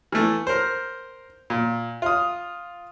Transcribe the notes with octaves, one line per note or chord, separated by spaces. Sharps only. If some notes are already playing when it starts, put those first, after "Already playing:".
E3 A3
A#4 C5
A#2
F4 D#6